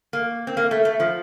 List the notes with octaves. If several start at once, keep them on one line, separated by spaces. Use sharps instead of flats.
A#3
C4
A#3
A3
A3
F3